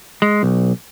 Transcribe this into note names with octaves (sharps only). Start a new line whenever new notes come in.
G#3
B1